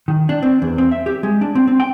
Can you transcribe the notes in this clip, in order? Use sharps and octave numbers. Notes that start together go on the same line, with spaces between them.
D#3
D4
C4
E2
C4
E5
G4
G#3
D4
C4
C4
G5